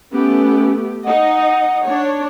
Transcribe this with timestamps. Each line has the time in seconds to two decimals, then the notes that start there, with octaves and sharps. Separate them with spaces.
0.12 A3 B3 C#4 G4
1.05 D#4 D#5 F#5
1.85 D4 C#5